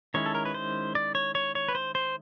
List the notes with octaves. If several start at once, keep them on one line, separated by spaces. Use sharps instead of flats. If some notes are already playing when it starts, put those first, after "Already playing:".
D#3 G#3 C#4 E4 C#5
A4
A#4
B4
C5
D5
C#5
C#5
C#5
B4
C5
C5